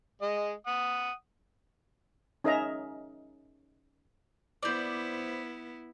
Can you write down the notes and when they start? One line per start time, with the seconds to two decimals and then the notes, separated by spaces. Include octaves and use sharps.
0.22 G#3 D#5
0.67 F#5 D#6
2.44 C#4 D#4 A#4 D#5 E5 A#5
4.63 B3 E4 C5 D5